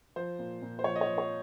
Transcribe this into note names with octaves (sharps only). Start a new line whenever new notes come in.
F3 C5
A#2
A#2
C5
F3 C#5
D#5
C#5
F3
C#5